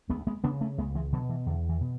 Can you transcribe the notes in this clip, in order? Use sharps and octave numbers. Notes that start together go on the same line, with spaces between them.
D2 G#3 B3
G#3 B3
C#3 B3 D4
A3 C#4
C#2 G#3 B3
E3 G#3
B2 D3 F#3
E3
E2 D3
E3
B2